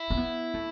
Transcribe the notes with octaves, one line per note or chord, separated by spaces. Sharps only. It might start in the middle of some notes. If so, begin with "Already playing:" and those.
Already playing: E4
C4
B3
A3